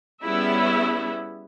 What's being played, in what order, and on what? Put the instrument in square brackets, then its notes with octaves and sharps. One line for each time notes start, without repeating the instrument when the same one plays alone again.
[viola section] G3 B3 C#4 E4 G#4 E5